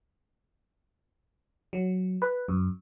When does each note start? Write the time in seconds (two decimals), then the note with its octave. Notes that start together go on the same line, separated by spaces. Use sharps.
1.73 F#3
2.22 B4
2.48 F#2